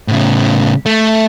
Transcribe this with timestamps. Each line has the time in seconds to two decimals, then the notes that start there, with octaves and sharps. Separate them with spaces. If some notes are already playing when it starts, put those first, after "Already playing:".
0.08 A2 C#3
0.86 A3